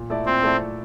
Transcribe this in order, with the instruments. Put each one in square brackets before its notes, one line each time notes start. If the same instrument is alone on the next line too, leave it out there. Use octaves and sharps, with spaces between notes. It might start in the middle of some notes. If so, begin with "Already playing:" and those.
Already playing: [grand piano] A#2
A3 E4 A4 D5
[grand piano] A#2 [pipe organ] C4
[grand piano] A3 E4 A4 D5